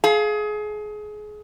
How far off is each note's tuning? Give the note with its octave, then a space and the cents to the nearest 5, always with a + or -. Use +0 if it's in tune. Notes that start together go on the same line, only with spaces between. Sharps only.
G#4 +25 F5 +0